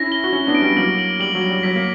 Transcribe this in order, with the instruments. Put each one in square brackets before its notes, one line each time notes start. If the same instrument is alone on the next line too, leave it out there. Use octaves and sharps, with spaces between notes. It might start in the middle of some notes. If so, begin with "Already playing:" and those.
Already playing: [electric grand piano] C#4 E4 [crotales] A#6
[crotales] G7
[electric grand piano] F#4
[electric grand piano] C#4 E4 [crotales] G7
[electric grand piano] B3 D4
[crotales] D7
[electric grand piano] G3 B3
[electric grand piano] F#3 A#3 [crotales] F#7
[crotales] F#7
[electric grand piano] G3 [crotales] F#7
[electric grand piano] F#3
[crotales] F#7
[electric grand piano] G3
[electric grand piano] F#3 [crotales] B6
[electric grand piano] A#3